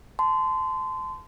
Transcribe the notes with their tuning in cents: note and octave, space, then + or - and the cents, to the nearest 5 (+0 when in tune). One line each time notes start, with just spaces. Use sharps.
A5 -15 C6 -25